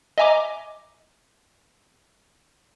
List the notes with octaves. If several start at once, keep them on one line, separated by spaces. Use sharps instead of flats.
D#5 E5 G#5 A#5 D6